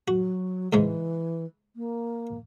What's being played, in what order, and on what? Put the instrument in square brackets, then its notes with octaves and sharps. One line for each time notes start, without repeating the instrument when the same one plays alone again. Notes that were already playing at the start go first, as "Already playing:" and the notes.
[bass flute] F#3 [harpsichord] F#4
[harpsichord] G#2 C#3 G#3 [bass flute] E3
[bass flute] A#3